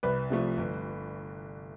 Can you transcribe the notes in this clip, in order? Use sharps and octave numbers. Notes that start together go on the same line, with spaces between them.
C2 B4
C3 F3 A3
G1